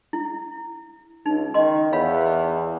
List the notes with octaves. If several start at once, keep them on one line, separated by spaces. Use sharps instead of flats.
E4
C#2 D#4
D#3 D#5 C6
E2 C#5 F5 B5